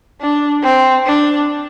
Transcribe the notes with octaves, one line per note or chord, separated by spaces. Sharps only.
D4
C4
D4